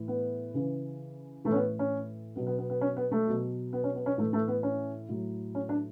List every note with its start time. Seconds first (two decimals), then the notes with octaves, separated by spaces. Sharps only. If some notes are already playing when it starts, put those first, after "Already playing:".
Already playing: A2 E3
0.08 B3
0.54 C#3 E3
1.44 E3 A3
1.49 A2 C#4
1.56 B3
1.79 C#4
2.36 B2 F#3 B3
2.47 B3
2.58 B3
2.70 B3
2.81 C#4
2.97 B3
3.12 A3
3.27 B2 F#3
3.73 B3
3.84 C#4
3.95 B3
4.06 C#4
4.18 A2 E3 A3
4.33 A3
4.48 B3
4.63 C#4
5.09 A2 F#3
5.55 C#4
5.69 D4